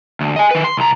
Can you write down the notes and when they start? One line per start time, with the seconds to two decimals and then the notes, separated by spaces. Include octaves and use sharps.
0.21 D2
0.36 D#5 G#5
0.51 D#3 B4
0.64 C6
0.77 C2 A#5